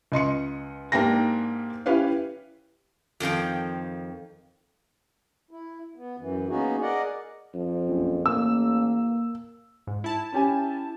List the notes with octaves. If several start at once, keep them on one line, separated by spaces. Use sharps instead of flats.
C#2 D#5 C6 C#7
G#2 A#3 D4 G4 G5 A#6
C#4 E4 G4 B4 C#5 F5
F2 D#3 F3 G5
E4
B3
F#2 E3
A#3 B3 C#4 D#4 F#4 G#4
G#4 A#4 D5 D#5 F#5
F2
A#1 F#2
A1 A#3 E6
G#2
E4 A5
C#4 G4 G#5